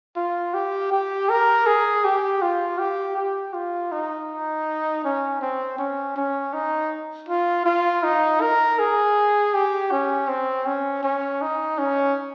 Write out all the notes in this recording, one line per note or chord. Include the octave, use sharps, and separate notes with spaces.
F4
G4
G4
A#4
G#4
G4
F4
G4
G4
F4
D#4
C#4
C4
C#4
C#4
D#4
F4
F4
D#4
A#4
G#4
G4
C#4
C4
C#4
C#4
D#4
C#4